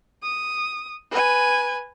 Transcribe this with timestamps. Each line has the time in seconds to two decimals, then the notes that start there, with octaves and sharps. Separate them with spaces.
0.23 D#6
1.11 B4 G#5